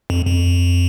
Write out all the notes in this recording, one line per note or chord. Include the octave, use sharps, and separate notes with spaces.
F2
F2